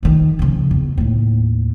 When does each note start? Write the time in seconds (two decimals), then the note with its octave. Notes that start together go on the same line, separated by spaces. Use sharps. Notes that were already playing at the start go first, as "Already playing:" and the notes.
0.03 F2 D#3
0.39 C#3 F3
0.71 E2
0.98 D#2 A2